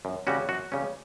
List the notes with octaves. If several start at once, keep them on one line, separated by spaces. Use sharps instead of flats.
F#2
C#3 G3 C#4 F#4
F#2 F#4
C#3 G3 C#4